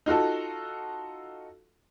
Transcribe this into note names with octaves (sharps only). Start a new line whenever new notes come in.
D#4 F4 F#4 A4